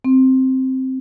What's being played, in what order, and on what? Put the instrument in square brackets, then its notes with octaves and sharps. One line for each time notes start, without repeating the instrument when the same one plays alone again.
[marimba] C4